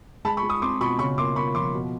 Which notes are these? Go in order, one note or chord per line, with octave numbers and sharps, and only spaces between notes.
G#3 A5 B5
B5 C#6
G#3
C#6 D#6
C4 C6 D6
B2 B5 C#6
C#3 B5 C#6
A#3 C6 D6
A#3 B5 C#6
F3 C6 D6
B2